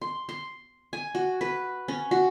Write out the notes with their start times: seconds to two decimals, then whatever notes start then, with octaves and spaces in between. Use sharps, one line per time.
0.01 C6
0.29 C6
0.93 G#5
1.15 F#4
1.41 B4
1.88 C#4
2.11 F#4